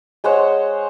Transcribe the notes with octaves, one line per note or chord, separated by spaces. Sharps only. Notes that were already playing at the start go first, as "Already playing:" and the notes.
G#3 C5 C#5 F#5